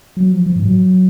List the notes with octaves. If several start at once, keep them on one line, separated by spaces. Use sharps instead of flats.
F#3
F3
F3
G#2
F#3